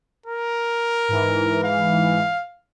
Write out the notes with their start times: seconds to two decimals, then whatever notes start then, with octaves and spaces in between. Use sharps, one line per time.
0.26 A#4
1.09 G#2 E3
1.64 F5